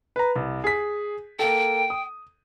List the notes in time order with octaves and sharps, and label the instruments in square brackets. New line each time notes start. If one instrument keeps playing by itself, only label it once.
[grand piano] B4 A#5
C2
G#4 B6
[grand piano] A#3 A4 [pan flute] G5
[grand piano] D#6